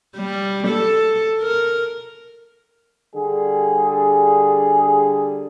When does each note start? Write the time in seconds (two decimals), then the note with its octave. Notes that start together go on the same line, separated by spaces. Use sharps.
0.16 G3
0.67 A4
1.41 A#4
3.16 D3 G3 G#4